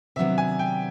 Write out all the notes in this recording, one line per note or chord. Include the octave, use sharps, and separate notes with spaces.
C3 D#3 F#3 B3 D4 E5
G#5
G5